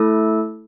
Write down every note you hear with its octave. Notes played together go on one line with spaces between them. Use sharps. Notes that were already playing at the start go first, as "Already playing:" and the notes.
Already playing: A3 E4 A4